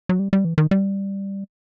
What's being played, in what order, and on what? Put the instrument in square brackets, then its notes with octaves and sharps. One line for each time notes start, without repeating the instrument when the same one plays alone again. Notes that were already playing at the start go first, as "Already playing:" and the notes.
[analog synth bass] F#3
G3
G3
E3
D#3
G3